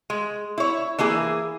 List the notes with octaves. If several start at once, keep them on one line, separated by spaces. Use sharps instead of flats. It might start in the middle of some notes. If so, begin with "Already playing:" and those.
G#3
E4 C#5
E3 A#3 E4 G#4